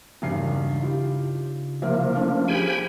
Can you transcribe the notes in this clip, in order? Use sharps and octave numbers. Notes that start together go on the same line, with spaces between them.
E1 G2 C#3 D4 D#4 C7
E4 F4 G4
C2 F3 A#3 A#4 E5
A3 C#4 D4
G4 G#4 C5 G5 G#5 B5